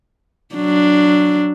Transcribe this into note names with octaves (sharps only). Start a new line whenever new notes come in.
F#3 D4